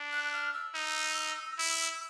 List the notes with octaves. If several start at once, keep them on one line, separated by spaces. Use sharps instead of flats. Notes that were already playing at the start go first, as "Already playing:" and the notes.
Already playing: D4
F#6
F6
E6
D#4
E4